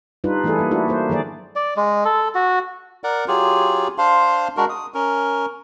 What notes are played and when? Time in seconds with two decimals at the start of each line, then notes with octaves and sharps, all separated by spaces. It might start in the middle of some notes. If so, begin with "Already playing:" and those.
0.24 G3 D4 D#4 F4 B4
0.44 E3 A3 D4 E4 G#4 A4
0.58 G3 A#3
0.71 A3 D4 E4 F#4
0.88 A#3 C5
1.09 D#3 F#3 G#4 D5
1.56 D5
1.76 G#3
2.05 A4
2.35 F#4
3.04 A#4 D5 F#5
3.28 F#3 F4 G4 G#4
3.98 D4 C5 F5 C6
4.57 G#3 D4 F#4 A#4
4.69 D#6
4.94 C#4 A#4